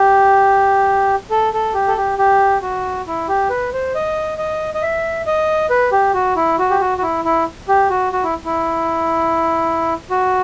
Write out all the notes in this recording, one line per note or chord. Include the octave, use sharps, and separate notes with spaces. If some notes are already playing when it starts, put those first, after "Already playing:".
Already playing: G4
A4
A4
G4
A4
G4
G4
F#4
E4
G4
B4
C5
D#5
D#5
D#5
E5
D#5
B4
G4
F#4
E4
F#4
G4
F#4
F#4
E4
E4
G4
F#4
F#4
E4
E4
F#4